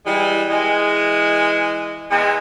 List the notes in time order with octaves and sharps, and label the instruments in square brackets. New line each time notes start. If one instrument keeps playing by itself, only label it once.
[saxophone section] E3 G3 G#3
E3 G#3
E2 G#3